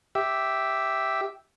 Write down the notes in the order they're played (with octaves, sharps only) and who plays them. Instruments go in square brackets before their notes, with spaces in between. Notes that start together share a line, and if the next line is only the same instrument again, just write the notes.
[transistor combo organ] G4 E5